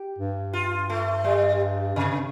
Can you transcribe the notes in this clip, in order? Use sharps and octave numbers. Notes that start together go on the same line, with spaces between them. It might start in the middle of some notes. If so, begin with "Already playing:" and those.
Already playing: G4
G2
F4
A3
G3
G2 C3